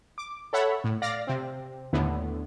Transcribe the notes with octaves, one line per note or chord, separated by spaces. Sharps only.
D6
A4 C#5 E5 F#5 B5
A2
D5 F5 A#6
C3 C4
D#2 A2 D3 B3